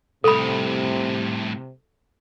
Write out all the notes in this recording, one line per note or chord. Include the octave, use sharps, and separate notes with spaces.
C2 A2 C3 A4 B5